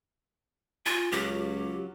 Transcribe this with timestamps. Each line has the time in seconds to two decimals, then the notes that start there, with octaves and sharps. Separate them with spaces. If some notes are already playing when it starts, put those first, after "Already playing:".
0.86 F4 G#5
1.12 C#2 F#3 C#4 F4 G4